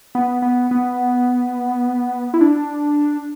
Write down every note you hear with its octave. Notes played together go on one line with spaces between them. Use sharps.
B3
B3
B3
E4
D4